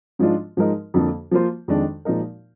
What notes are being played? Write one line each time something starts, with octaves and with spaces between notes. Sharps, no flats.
G#2 F3 G#3 D4 F4
G#2 F3 G#3 D#4 A#4
F2 D3 F3 A#3
F3 A#3 F4 C5
F2 D#3 G#3 D4
A#2 F3 G#3 D#4 A#4